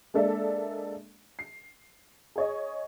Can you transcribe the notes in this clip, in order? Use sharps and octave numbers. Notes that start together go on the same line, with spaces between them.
G#3 A#3 D4 A4 D5 E5
C7
G#4 C#5 D#5